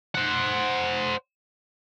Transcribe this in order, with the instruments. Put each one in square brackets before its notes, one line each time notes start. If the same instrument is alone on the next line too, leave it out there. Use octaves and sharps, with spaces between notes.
[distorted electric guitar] C5 F#5